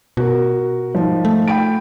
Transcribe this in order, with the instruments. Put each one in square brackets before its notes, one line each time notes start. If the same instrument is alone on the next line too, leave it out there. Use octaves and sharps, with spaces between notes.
[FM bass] B2 [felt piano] F#4 A#4
[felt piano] G#2 F3
[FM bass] A3
[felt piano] G5 B5 D7